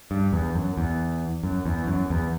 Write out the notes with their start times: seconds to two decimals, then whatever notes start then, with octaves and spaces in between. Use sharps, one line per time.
0.11 G2
0.33 E2
0.55 F#2
0.77 E2
1.43 F#2
1.66 E2
1.87 F#2
2.10 E2